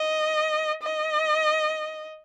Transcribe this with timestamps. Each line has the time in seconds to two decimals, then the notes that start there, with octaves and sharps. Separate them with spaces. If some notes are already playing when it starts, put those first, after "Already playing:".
Already playing: D#5
0.83 D#5